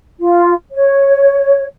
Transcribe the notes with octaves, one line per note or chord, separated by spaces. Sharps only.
F4
C#5